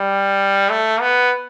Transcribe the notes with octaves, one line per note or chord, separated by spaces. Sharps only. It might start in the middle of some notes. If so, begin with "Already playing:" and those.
Already playing: G3
A3
B3